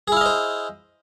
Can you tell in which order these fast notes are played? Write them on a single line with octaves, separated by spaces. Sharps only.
G#4 E4 F5 D#5 C5